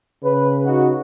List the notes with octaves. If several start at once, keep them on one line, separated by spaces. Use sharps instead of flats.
C#3 B4
D#4 F#4